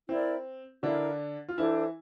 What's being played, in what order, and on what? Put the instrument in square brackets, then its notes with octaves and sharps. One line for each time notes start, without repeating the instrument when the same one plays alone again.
[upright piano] C4 [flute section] E4 A#4 D5
[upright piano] D3 D4 [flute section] E4 A#4 F5
[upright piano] F4
[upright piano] E3 E4 [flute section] D4 A4 C5